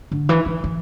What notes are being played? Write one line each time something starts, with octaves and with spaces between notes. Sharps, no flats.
D3
E3
E3
E3